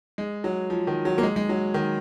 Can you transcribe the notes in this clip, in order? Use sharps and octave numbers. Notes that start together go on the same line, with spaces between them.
G#3
F#3
F3
D#3
F#3
A#3
G#3
G#3
F#3
D#3